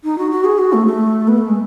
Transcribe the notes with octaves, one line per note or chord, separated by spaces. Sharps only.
D#4
F#4
F#4
G#4
F#4
A3
A3
B3
A3
G#3